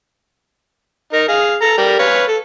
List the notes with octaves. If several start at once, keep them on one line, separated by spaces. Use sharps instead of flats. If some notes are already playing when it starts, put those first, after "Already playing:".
D#4 A#4
G#4 F5
A4 A#5
G3 A#4
B4 C#5 F5
A4